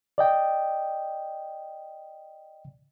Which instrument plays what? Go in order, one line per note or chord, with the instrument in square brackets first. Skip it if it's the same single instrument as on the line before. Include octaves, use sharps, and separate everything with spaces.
[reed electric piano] D5 D#5 G5